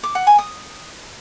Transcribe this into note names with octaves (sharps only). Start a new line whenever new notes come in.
D6
F#5
G#5
D#6